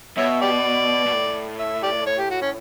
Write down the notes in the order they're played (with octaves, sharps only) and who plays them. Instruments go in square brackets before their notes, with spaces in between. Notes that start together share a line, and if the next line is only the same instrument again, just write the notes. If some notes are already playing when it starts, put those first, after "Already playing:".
[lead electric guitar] B2 [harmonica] C#5 E5
[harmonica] G4 D5
[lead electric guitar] B2
A2
[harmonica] E5
G4 D5
C#5
G4
F#4
C#4